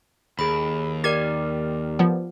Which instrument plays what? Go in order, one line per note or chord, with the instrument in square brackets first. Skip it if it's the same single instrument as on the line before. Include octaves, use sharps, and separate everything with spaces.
[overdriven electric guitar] D#2 [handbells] G#4 B5
[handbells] G4 A#4 D5 [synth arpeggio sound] G#6
[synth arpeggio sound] F3 B3